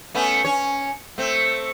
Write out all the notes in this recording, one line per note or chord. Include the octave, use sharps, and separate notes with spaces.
A3 B3 C#4
C#4 C#5
A3 C4